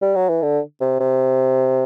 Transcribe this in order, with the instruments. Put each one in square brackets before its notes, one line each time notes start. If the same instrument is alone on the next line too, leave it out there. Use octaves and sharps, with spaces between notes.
[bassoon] G3
F#3
E3
D3
C3
C3